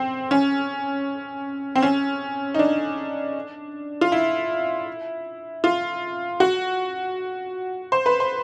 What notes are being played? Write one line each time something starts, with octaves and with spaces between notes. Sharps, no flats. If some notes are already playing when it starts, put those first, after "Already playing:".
Already playing: C4
C#4
C4
C#4
D#4
D4
F4
E4
F4
F#4
C5
B4
C5